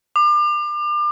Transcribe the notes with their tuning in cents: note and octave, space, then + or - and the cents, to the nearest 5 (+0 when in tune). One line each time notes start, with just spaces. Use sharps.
D6 +35